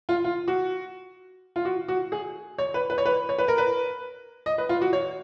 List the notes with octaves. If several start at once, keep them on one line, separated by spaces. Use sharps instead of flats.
F4
F4
F#4
F4
F#4
F#4
G#4
C#5
B4
B4
C#5
B4
C#5
B4
A#4
B4
D#5
B4
F4
F#4
C#5